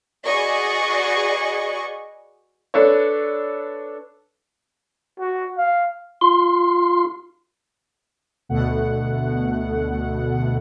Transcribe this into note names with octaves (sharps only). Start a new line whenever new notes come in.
F#4 G#4 B4 D5 D#5 C#6
D4 A4 B4 C#5
F#4
F5
F4 C6
D2 B2 A3 F#5